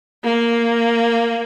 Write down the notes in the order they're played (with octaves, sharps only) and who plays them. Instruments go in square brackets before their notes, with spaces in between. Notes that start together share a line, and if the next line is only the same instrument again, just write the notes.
[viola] A#3